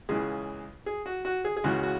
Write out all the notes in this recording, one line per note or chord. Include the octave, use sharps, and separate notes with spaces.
C#2 C#3 E3 G#4
G#4
F#4
F#4
G#4
G#4
C#2 C#3 E3 F#4
F#4